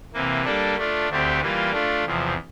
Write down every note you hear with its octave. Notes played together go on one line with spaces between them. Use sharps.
C3 E3 A#3
G3 A#3 D4 A4
A3 D4 F4
D2 D3 A3 C4 G4
E3 G3 A#3 F4
A3 D4 F4
E2 C3 F3